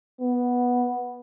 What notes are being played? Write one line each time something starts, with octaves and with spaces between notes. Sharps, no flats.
B3